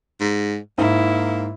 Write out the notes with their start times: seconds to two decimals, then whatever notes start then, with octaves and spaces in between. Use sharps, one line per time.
0.20 G#2
0.78 G#2 A#3 E4